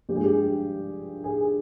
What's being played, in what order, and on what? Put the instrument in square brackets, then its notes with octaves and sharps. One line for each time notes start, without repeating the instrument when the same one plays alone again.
[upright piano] G2 F3 G#3 G4
G#4
G4
G#4